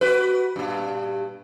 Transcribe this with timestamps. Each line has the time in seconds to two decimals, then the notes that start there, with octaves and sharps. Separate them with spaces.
0.01 F#4 B4
0.56 G2 A#2